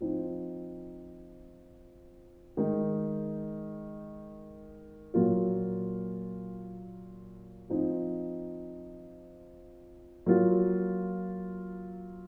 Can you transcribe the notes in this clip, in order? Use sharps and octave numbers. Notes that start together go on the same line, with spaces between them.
F3 C4 D#4
D#3 G#3 D#4
A#2 F#3 A#3 F4
F3 C4 D#4
F#3 A#3 F4